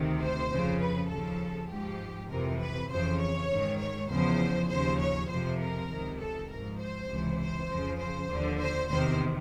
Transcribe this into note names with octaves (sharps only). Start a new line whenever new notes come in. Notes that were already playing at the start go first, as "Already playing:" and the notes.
Already playing: D2 C3 D#3
C5
F2 C#3 F3
B4
D#2 C#3 F3 A4
G#2 F3 G4
F2 C3 E3 A#4
B4
F2 C#3 E3 C5
C#5
G#2 D#3
C#5
E2 C#3 F3 C5
D#2 C#3 F3 C5
C#5
F2 C3 F3 C5
A#4
C#2 C3 D#3
A4
G#2 F3 A#4
C5
C#2 C3 E3
C5
F2 C#3 F3
C5
D#2 D3 F3
C5
E2 C3 D#3 C5